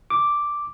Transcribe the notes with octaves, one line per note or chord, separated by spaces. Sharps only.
D6